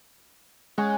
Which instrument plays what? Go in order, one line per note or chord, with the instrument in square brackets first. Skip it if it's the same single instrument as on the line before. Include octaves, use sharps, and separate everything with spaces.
[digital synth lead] G#3 [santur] C#4 C#5 F#5